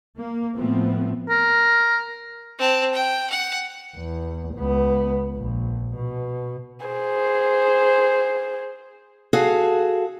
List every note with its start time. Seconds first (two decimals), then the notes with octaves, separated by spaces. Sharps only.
0.17 A#3
0.55 A2 F3 A3 B3 C4
1.29 A#4
2.58 C4 A5
2.94 G5
3.30 F#5
3.97 E2
4.55 C#2 B3
5.35 A#1
5.96 B2
6.86 G#4 C5
9.33 F#4 G#4 A4 F5